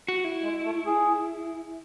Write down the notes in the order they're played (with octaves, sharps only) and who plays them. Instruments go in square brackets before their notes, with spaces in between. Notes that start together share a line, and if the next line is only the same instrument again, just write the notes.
[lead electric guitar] F#4
E4
[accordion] G#3
A3
G#4